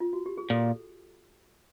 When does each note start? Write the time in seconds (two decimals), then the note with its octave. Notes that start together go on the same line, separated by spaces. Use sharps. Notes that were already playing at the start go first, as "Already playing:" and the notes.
0.00 F4
0.13 F#4
0.26 G4
0.37 G#4
0.50 A#2 A4